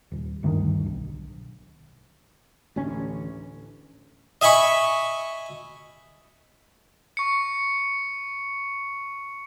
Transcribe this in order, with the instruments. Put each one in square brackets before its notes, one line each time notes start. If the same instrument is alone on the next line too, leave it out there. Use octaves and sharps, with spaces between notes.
[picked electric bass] D#1
G#1 D2 G2 D#3
B1
[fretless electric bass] A1 D2 C#4 D4
[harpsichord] D#5 E5 G#5 B5 C#6
[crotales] C#6 C#7